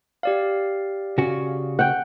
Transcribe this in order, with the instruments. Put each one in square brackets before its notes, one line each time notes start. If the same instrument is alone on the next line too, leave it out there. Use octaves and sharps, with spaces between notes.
[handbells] G4 D5 F5
[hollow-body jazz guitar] C#3 F#4
[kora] F#5 G5